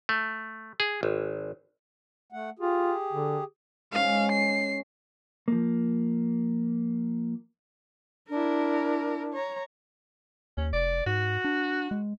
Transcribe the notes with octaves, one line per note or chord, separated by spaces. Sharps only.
A3
G#4
G#1
A3 F#5
F4 G4 G#4
D3
G#2 C#4 F5
C7
F3 A#3
D4 E4 A#4
C#5 A#5
D#2 C#4
F1 D5
G#2 F#4
D4
G#3